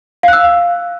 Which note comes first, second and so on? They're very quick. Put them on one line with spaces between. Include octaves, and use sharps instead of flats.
F5 F#6 E6